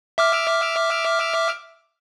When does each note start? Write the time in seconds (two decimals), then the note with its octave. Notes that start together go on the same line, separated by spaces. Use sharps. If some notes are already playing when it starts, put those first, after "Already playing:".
0.18 E5 D6 F6